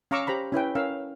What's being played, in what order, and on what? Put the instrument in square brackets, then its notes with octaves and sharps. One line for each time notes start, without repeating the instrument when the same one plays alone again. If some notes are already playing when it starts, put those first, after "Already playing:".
[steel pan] C#4 F5 A#5 C#6 D6 E6
G4 C5 A#5 B5
C#4 E4 B4 G5
C#4 A#4 F5 E6